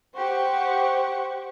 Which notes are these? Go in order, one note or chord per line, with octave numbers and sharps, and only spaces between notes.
G4 C5 F#5 C#6